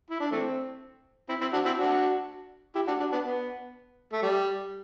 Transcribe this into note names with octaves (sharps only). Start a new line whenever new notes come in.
E4
D4
E3 A3 C4
C4 E4
C4 E4
D4 F#4
C4 E4
D4 F#4
E4 G4
D4 F#4
D4 F#4
B3 D4
B3
A3
G3